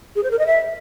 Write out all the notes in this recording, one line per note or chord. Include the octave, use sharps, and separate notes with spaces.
G#4
C5
A#4
D#5
E5